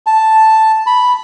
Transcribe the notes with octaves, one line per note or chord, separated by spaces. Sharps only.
A5
B5